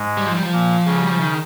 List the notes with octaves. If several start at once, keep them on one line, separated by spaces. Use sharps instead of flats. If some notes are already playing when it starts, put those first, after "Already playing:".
Already playing: G#2 G#3
G3
F3
G3
F3
A#2 A#3
C#3 G#3 C#4
G3
F3
D#3